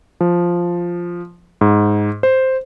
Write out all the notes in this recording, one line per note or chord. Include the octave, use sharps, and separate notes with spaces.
F3
G#2
C5